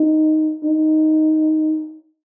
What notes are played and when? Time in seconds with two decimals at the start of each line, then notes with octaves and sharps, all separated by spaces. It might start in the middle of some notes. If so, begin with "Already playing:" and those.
Already playing: D#4
0.64 D#4